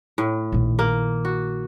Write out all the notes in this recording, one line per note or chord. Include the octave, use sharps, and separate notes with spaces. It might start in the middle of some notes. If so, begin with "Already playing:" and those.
A2
A#1 D#3
A#3
F#4